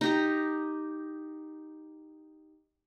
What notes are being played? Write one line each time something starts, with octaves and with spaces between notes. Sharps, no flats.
D#4 G4 A#5